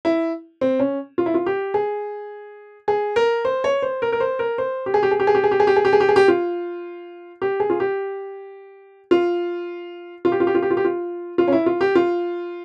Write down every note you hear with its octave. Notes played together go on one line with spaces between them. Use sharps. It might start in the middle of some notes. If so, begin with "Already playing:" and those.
E4
C4
C#4
F4
E4
F4
G4
G#4
G#4
A#4
C5
C#5
C5
A#4
A#4
C5
A#4
C5
G4
G#4
G4
G#4
G4
G#4
G4
G#4
G4
G#4
G4
G#4
G4
G#4
G4
G#4
G4
F4
G4
G#4
F4
G4
F4
F4
G4
F4
G4
F4
G4
F4
G4
F4
F4
C#4
E4
F4
G4
F4